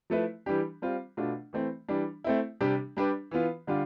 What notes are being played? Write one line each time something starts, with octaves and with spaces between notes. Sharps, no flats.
F3 A3 E4 B4
E3 G3 D4 G4
G3 C4 F4
B2 A3 D4 F4
E3 A3 C4
E3 G3 D4
A3 C4 E4
C3 G3 D4 G4
G3 D4 G4 B4
E3 B3 F4
D3 G3 D4 F4